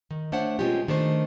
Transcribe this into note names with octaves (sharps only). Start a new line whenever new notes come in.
D#3
A3 D4 C5 C#5 F#5
B2 G#3 C#4 F4 G4
D#3 A3 D4 C5